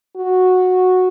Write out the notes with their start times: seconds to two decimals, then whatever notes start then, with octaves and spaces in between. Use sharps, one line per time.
0.17 F#4